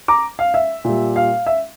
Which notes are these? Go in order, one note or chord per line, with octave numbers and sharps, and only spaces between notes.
A#5 D6
F5
E5
A#2 G3
F5
E5